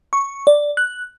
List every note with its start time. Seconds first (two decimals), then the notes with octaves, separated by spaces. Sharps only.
0.13 C#6
0.47 D5
0.77 F#6